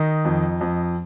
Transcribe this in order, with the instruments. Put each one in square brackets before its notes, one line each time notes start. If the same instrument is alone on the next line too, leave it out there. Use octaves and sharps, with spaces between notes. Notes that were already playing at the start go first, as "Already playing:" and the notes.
Already playing: [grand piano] D#3 D#4
F2
F2